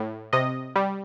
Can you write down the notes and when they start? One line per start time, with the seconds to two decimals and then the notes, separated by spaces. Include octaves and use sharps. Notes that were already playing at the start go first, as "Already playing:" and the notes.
Already playing: A2
0.33 C3 D#5
0.76 G3